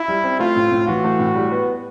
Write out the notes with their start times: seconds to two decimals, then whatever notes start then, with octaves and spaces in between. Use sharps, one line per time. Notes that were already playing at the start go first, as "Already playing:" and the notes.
Already playing: E4
0.08 G3
0.23 C4
0.39 A3 F4
0.56 A2
0.71 A2
0.87 E3 F#4
1.04 A3
1.19 A2
1.35 G3
1.52 B3